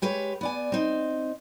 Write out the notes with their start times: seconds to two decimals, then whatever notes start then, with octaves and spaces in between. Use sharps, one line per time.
0.02 G#3 G4 B4 C#5
0.41 B3 D5 G#5
0.72 C4 D#4